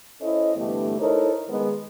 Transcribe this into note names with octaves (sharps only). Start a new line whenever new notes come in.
C#4 E4 A4 C5 D#5
G2 D3 E3 A3 B3 G4
D#4 E4 A4 A#4 C5 C#5
D#3 G#3 B3